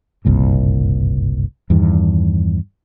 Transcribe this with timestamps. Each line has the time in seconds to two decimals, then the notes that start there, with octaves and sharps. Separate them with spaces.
0.25 F#1 C2 G2 A#2
1.70 E2 G2 D#3